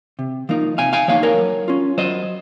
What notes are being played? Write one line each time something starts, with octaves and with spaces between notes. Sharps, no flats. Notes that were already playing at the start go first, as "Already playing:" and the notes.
C3
F3 A#3 D#4
C3 F5 G#5
F5 G#5
F3 A#3 D#4 C#5 F5
A#4 C#5
F#3
C#4 F4
F#3 C5 D#5